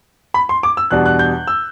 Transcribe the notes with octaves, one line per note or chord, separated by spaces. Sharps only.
B5
C6
D6
E6
E2 B2 G3 D4 F#6
F#6
G6
E6